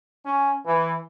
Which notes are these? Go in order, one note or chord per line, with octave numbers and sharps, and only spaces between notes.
C#4
E3